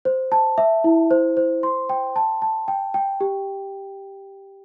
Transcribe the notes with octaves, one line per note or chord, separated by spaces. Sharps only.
C5
A5
E5
E4
C5
C5
C6
G5
A5
A5
G5
G5
G4